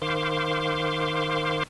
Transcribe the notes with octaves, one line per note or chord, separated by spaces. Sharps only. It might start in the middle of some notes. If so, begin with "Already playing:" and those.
D#3 C5 F5 C6 D6